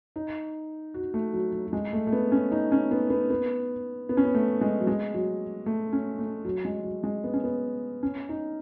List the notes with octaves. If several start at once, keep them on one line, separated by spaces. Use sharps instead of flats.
D#4
F#4
A3
F#3
F#3
F#3
G#3
A3
A3
B3
C#4
D#4
C#4
B3
B3
B3
B3
C#4
B3
A3
G#3
F#3
G#3
F#3
A3
C#4
A3
F#3
G#3
F#3
G#3
B3
C#4
B3
C#4
D#4